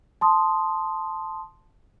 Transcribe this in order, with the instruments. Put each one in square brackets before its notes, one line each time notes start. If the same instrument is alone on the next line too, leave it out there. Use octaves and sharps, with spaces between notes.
[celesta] A5 C6 D#6